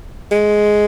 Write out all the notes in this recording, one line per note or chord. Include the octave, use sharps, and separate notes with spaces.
G#3